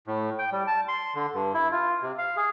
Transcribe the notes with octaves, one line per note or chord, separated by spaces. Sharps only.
A2
G5
G3
A5
C6
D3
G2
E4
F4
C3
F5
G#4